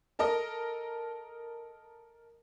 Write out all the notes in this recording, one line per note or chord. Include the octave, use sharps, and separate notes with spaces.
A4 A#4 D#5